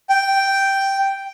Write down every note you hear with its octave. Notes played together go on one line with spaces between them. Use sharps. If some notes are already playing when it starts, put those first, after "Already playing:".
G5